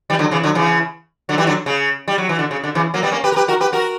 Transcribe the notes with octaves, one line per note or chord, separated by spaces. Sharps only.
E3 G3
D3 F#3
C#3 E3
D3 F#3
C#3 E3
D3 F#3
E3 G3
D3 F#3
C#3
G3
F#3
E3
D3
C#3
D3
C#3 E3
F#3 A#3
G3 B3
A#3 C#4
G4 B4
A#4
G4 B4
F#4 A#4
G4 B4
F#4 A#4